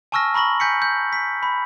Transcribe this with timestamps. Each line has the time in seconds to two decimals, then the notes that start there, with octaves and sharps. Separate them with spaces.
0.12 G#5 A5 C#6 E6 F6 A#6
0.34 A#5 B5 C#6 A#6 F#7
0.60 G#5 G6 B6 C#7
0.82 G6
1.13 B6
1.43 B5